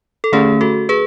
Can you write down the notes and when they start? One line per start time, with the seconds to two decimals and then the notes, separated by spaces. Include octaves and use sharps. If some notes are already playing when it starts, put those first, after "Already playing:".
0.24 A4
0.32 D3 A3 C#4 G#4
0.61 F#4 A4
0.89 G#4 B4